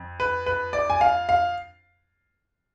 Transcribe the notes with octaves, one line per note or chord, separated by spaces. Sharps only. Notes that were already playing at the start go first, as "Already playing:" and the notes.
Already playing: F2
B4
B4
D5
G#5
F5
F5